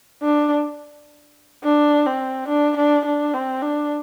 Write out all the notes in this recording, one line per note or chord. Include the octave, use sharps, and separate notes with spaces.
D4
D4
C4
D4
D4
D4
C4
D4